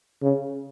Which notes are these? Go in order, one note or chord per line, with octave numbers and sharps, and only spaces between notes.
C#3